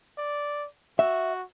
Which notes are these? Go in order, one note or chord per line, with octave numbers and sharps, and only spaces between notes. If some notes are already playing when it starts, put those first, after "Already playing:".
D5
F#4 E5